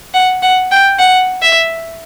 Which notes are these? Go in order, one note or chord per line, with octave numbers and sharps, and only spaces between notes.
F#5
F#5
G5
F#5
E5